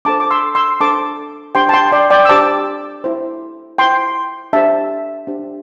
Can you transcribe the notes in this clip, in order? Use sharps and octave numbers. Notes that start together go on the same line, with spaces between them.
D4 A4 C5 A5 D6
D6
C6 E6
C6 E6
D4 A4 C5 A5 D6
D4 G4 C5 G5 C6
A5
G5 C6
D5 G5
D5 G5
E6
D4 G4 C5 A5 D6
E4 C5
E4 C5 G5 C6
D4 G4 C5 E5 A5
D4 G4 C5